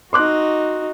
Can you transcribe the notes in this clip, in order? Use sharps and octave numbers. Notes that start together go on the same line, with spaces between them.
D#4 F#4 C6 D6 F#6